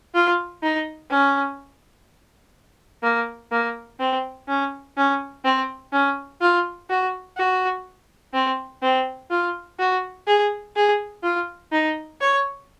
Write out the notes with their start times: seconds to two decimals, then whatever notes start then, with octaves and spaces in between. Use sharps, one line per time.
0.15 F4
0.63 D#4
1.10 C#4
3.03 A#3
3.52 A#3
4.00 C4
4.48 C#4
4.97 C#4
5.44 C4
5.93 C#4
6.41 F4
6.90 F#4
7.37 F#4
8.34 C4
8.82 C4
9.31 F4
9.79 F#4
10.27 G#4
10.76 G#4
11.23 F4
11.72 D#4
12.21 C#5